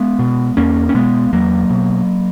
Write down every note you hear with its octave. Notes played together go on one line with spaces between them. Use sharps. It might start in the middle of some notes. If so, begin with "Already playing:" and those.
Already playing: G#3 B3
B2
E2 A#3 C#4
C#4
B2 G#3 B3
E2 F#3 A#3
B2